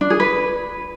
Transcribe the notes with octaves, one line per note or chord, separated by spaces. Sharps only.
D4
G#4
B4